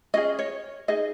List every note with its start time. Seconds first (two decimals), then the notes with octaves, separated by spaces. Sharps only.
0.14 C#4 F4 G#4 D#5
0.39 C#5
0.88 D#4 G#4 D#5